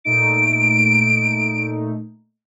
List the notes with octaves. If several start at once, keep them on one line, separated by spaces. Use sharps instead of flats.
A#2 A3 D#4 D7